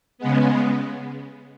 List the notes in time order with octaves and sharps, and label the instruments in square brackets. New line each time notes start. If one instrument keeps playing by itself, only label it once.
[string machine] C#3 G#3 B3